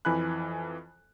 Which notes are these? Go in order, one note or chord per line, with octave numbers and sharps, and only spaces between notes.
F2 E3 G#5 B5 F#6